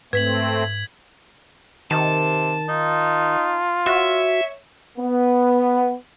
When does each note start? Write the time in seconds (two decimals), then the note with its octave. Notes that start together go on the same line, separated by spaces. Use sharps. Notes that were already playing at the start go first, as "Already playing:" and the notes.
0.13 G#2 A3 C4 B4 G#6 B6 F#7
1.91 C3 D#3 A5
2.69 D#4 F4
3.86 F#4 C#5 E5
4.99 B3